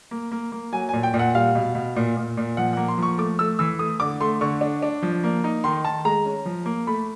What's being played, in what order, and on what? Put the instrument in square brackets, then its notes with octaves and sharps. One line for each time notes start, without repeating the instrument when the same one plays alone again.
[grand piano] A#3
A#3
A#3
F#3 G#5
A#2 G#5
G5
A#2
F#5
G3 F5
B2
B2
A#2
A#2
A#2
F3 F#5
A#3 F#5
C6
F3 C#6
A3 D6
A3 E6
E3 E6
A3 D#6
D3 D6
A3 C6
D3 C#6
D4
D4
F3
A#3
D#4
D#3 C6
D#3 A5
G#3 A#5
C#4
F3
A#3
A3 B5